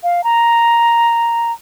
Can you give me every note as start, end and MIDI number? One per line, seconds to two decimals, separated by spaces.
0.03 0.24 77
0.24 1.52 82